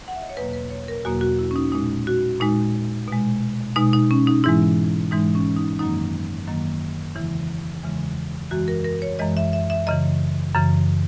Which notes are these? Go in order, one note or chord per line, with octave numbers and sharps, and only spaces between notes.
F#5
E5
D#5
C#5
E2 B2 F#3 A#3 B4
B4
C#5
A#4
E2 B2 F#3 A#3 F#4
F#4
E4
C#4
D#4
A#2 G#3 D#4
F#4
A#2 G#3 D#4
B2 G#3
B2 G#3 D#4
D#4
C#4
D#4
G#2 E3 G#3 E4
G#2 E3 G#3 D#4
C#4
D#4
F#2 D#3 F#3 A#3 D#4
F#2 D#3 F#3 A#3
E2 C#3 E3 G#3 E4
E2 C#3 E3 G#3
F#2 E3 G#3 F#4
A#4
A#4
C#5
F#2 E3 G#3 D#5
E5
E5
E5
F#2 C#3 E3 D#5
F#2 C#3 E3